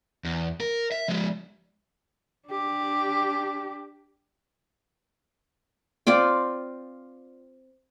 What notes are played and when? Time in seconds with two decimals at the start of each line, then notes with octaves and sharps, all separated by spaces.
0.24 E2
0.61 A#4
0.92 E5
1.08 F3 G#3
2.49 D4 G4
6.07 C4 F4 D5 G5